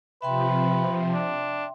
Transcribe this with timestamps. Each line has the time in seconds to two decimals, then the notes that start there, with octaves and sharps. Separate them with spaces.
0.22 C3 F3 B4 E5 G5 C6
1.13 D4